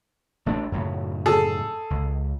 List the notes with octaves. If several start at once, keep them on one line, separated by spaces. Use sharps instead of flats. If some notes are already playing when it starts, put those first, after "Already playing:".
A1 A3 D4
F#2 A2 C#3
G#4 A4
C#2